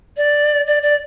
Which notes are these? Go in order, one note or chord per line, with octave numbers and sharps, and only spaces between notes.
D5
D5
D5